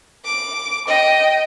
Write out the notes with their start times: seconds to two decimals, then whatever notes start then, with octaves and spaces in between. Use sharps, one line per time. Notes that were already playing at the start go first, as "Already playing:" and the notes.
0.25 D6
0.87 D#5 G5